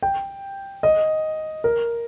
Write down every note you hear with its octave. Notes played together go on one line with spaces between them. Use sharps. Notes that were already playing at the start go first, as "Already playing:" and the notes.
G5
D#5
A#4